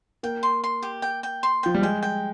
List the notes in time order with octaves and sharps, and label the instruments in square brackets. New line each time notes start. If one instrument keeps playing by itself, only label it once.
[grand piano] A#3 [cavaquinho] G5
[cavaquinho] C6
C6
G4
G5
G5
C6
[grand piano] F3 [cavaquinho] G5
[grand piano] G3
[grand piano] G#3 [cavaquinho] G5
[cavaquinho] G5